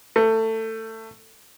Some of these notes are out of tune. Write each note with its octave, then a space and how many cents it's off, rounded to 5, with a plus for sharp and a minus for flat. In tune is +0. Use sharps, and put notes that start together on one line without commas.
A3 +20